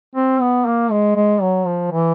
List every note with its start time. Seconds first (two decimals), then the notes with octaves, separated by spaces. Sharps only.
0.16 C4
0.41 B3
0.66 A#3
0.91 G#3
1.16 G#3
1.41 F#3
1.66 F3
1.91 E3